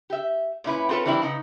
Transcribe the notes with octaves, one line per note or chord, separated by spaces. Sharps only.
G4 E5
A#2 C#4 E4 B4
C4 F4 A4 B4 C#5
E3 G3 C4 D4 E4
C#3 B3 D#4